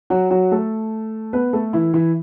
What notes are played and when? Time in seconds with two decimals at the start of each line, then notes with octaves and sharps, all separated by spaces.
0.10 F#3 F#4
0.30 F#3 F#4
0.52 A3 A4
1.33 B3 B4
1.53 A3 A4
1.73 E3 E4
1.94 E3 E4